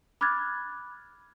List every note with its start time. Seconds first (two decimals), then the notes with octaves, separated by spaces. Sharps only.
0.21 B5 D6 F6 F#6 G#6 A6